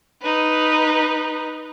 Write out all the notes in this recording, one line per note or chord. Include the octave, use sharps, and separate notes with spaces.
D#4 B4